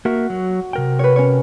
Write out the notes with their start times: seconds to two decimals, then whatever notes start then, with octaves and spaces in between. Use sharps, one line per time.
0.05 A#3 F#4 A#4 E5
0.30 F#3
0.73 C3 A#4 G5
0.99 B4 C#5
1.16 C#4 C#5